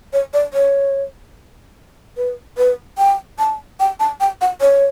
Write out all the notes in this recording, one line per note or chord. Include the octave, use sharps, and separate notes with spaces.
C#5
D5
C#5
B4
B4
G5
A5
G5
A5
G5
F#5
C#5